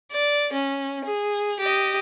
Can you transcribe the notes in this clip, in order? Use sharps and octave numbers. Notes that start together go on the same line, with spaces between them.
D5
C#4
G#4
G4 D#5